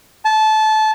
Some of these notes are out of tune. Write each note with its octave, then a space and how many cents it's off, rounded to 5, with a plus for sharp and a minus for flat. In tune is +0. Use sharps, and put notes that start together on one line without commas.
A5 -20